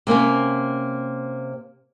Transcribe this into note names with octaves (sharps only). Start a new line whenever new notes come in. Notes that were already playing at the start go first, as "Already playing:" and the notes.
C3 A#3 C4 C#4